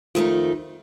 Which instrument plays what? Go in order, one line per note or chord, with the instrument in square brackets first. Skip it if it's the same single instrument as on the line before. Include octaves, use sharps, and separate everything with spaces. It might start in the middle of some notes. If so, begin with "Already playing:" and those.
[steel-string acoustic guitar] F2 D#3 A3 D#4 [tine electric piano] F4